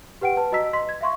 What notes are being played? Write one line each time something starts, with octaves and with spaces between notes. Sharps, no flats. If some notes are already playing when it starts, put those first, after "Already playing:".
G4 B4 F#5 G5 D7
B4 A5
F#4 D#5 A#5 E6 B6
D#5 C6 B6
G#6
E5 F5 C6 C#6